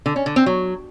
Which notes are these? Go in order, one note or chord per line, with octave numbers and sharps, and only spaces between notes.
D3
C#4
D3
C4
F#3